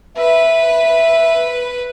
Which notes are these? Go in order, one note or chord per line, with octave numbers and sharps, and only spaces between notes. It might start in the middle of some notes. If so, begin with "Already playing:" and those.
B4 E5